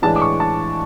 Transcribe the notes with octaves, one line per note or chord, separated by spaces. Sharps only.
A2 E3 G#3 D4 A5
D6
C#6
A5